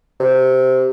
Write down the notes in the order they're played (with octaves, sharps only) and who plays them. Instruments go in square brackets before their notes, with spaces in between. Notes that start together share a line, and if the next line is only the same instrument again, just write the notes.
[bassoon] C3